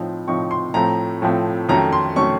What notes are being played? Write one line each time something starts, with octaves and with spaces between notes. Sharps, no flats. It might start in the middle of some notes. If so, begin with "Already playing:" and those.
Already playing: A2 F3 C4 D#4
A2 F3 C4 D#4 C#6
C6
A2 F3 A3 C4 A#5
A2 F3 A3 C4
F2 D#3 F#3 A3 C#4 A#5
C6
D#3 F#3 A3 C#4 C#6